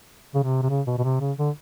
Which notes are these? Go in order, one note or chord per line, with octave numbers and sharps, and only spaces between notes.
C#3
C3
C3
C#3
B2
B2
C3
C#3
D3